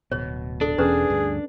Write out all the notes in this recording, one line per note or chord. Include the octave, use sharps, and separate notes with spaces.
D1 B2 C#5
D4 A4
E1 E2 C#4 G#4 B4 A#5
D2 G2